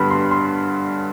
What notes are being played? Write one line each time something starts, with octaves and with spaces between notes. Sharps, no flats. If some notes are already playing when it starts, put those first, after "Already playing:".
Already playing: G2 D3 G3 B3 B5
C6
C6